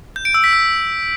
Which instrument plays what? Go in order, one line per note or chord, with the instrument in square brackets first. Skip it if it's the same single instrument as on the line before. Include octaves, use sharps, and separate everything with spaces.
[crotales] G6
D7
E6
B6
E6